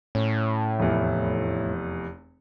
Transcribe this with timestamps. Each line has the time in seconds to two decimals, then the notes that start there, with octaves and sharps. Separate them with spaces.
0.15 A2 C#4
0.79 F1 E2